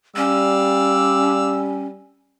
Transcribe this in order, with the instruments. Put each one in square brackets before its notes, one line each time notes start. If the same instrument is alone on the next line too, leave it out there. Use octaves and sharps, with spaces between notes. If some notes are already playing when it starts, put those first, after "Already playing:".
[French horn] G3 [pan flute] C#4 [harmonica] D5 F5 E6